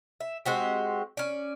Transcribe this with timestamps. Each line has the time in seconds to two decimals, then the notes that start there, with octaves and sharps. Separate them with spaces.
0.20 E5
0.45 G#3 C4 F#4 G4
1.17 C#4 D5